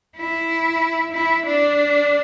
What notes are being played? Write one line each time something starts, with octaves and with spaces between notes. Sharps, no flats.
E4
E4
D4